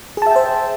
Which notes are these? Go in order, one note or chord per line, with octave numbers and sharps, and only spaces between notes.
G#4 C5 E5 G5 A5